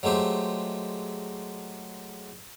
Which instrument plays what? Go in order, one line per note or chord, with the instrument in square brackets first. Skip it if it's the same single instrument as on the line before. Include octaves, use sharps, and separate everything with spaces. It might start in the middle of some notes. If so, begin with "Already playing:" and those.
[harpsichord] F#3 G#3 A3 G4 C5